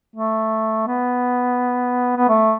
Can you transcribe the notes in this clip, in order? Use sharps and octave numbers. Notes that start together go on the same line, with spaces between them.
A3
B3
B3
A3